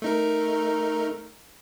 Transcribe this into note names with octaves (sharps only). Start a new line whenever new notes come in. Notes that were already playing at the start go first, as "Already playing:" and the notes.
A3 D#4 A#4